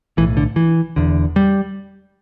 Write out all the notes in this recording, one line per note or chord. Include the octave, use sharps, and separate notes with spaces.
B1 A2 E3
D3
E3
E1 E2 D3
G3